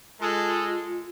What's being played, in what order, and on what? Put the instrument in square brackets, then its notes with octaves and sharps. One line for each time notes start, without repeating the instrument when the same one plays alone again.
[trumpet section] G#3 A4 [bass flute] F4